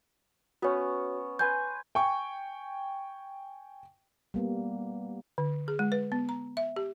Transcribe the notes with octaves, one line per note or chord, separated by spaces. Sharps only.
B3 C#4 F#4 C#5
B4 G#5 C6 G6
G5 G#5 C#6
G3 A#3 B3
D3
G#4
G#3
B4
B3
A#5
E5
G4